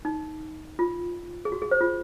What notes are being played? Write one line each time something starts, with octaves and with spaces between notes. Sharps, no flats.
D#4
F4
G#4
F#4
G#4
C5
F4